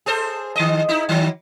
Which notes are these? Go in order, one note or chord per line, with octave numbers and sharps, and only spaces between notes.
G#4 A4 C5
D#3 D#5
D#4 E4
D#3 F#3